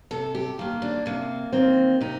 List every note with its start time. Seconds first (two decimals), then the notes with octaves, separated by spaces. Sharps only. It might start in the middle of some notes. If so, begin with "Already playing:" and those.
0.11 C3 A4
0.35 G4
0.59 D#3 A#3 F4
0.82 D4
1.06 C3 A#3
1.53 D#3 A#3 C4
2.01 C3 D#4